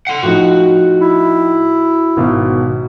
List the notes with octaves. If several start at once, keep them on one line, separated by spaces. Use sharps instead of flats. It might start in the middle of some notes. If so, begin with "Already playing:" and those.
F#5 C6
A2 F3 D#4 F#4
E4
G#1 B2